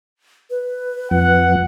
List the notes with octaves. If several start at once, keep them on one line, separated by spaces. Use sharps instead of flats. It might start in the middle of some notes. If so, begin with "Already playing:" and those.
B4
F2 F#5